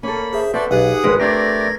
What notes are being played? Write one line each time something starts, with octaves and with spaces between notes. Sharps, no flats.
A#3 C#4 A4 B5
G#4 C5 E5
C4 F#4 A4 B4 D5 E5
B1 D#4 G4 G#4 F#5 D#6
G#1 G#3 A#4 B4
A3 C4 D4 G4 A#4 D5 G#6 A#6